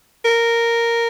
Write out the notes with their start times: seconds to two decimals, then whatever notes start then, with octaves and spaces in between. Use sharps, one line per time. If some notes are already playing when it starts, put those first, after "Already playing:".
0.25 A#4